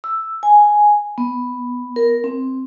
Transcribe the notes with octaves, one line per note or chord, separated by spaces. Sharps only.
E6
G#5
B3
A#4
C4